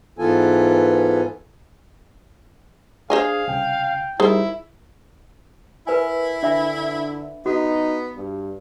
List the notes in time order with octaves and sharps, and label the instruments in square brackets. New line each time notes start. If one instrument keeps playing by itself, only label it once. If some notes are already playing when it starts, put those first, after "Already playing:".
[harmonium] G#2 E3 B3 F4 A4 G#5
[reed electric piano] D4 [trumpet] G#4 [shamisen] C5 D#5 G#5 [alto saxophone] F5
[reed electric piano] C2 C#3 [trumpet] G5
[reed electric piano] G3 D#4 A#4 [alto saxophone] E4 [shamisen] G#4 C5
[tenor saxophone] E4 [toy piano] A#4 B4 G#5
[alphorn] D3 [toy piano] D4 E5 B5
[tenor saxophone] B3 [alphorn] D#4 [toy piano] F#4
[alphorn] G2